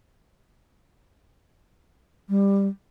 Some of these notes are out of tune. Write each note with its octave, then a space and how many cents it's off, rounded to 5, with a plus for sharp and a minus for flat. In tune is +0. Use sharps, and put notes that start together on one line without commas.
G3 +15